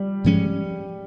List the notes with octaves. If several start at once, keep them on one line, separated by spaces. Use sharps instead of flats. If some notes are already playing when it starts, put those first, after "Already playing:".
Already playing: G3
G#2 F3 G#3 C#4